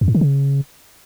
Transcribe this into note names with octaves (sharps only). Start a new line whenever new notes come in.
F2
G#2
D3
C#3